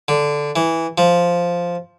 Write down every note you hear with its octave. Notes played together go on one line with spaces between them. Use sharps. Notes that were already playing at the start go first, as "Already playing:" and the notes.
D3
E3
F3